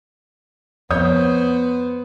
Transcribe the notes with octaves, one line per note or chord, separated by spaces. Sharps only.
F2 B3 C5 C#5 D#6 G6